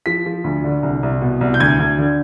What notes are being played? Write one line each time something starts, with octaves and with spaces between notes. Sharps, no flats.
F3 B6
F3
D2
D3
C2
C2
B2
C2
G6
D2 G#6
D2
D3